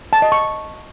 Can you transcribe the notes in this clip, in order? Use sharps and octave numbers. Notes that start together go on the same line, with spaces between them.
A5
D#5
C#6